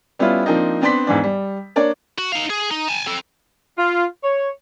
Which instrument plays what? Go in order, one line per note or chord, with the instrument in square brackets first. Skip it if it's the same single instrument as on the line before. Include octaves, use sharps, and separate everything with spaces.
[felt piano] G3 B3 C#4 E4 F4
F3 A#3 C4 D4 D#4
B3 C4 D4 D5 C6 B6
E2 G#2 E3 D4
G3
A#3 D4 C#5 D5
[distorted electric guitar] F#4
D#4 F5
G#4
D#4
G#5 A5
C4 A4
[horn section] F4
C#5